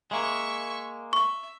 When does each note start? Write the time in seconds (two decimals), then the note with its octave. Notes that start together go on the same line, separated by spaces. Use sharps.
0.11 G#3 A#3 E5 C#6
1.13 E5 C#6